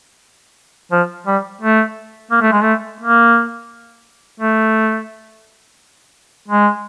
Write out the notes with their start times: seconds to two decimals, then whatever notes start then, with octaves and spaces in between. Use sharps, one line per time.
0.91 F3
1.26 G3
1.61 A3
2.31 A#3
2.41 A3
2.52 G#3
2.62 A3
3.00 A#3
4.40 A3
6.48 G#3